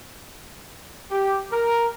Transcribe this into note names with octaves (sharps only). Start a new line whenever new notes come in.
G4
A#4